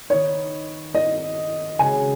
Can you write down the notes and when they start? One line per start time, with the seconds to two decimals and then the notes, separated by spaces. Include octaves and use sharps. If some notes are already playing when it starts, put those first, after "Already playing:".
0.10 D#3 B3 D#4 C#5
0.95 D#5
1.79 C#3 G#3 C#4 F#4 G#5